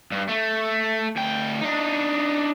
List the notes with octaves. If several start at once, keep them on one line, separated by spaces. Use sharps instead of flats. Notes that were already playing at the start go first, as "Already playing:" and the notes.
G2
A3
D2 G5
D4 D#4